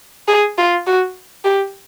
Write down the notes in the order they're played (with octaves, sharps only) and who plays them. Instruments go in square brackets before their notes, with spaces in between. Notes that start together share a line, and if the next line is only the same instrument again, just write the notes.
[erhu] G#4
F4
F#4
G4